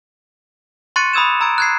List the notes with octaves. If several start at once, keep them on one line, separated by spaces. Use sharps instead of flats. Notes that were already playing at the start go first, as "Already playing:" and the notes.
C6 C#6 F#6 A6 C#7 D#7
B5 D#6 E6 G#6 E7
A#5 E6 G#6 D7
F#6 G#6 C7